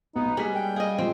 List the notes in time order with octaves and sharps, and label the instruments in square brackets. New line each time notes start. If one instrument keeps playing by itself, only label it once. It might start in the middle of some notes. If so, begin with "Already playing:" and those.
[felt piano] B1 [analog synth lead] B3 [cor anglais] D#4
[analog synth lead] G3 [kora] G#3 C#4 F#4 [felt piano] A#3 A#4 B6
[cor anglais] G5
[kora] G#4 D#5 [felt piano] F5
[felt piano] A#2 F3 G#3 [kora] C4